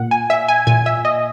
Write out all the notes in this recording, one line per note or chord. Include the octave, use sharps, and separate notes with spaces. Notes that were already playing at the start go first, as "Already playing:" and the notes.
Already playing: A#2 F#5
G#5
E5
G#5
A#2 G#5
E5
D#5